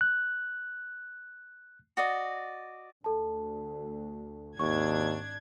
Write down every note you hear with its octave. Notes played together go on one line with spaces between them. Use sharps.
F#6
F#4 D5 D#5
D2 A4 A5
G#1 D#2 D4 C#6 G#6